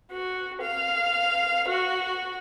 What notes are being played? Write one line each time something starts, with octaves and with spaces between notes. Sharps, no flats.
F#4
F5
F#4